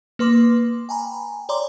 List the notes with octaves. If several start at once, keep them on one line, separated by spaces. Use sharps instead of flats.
A#3 B4 C6 D6
G5 G#5 A#5 B5
C#5 D5 A#5 C6 D6